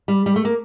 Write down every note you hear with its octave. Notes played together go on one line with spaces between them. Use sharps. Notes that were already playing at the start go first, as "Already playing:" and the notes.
G3
G3
A3
A#3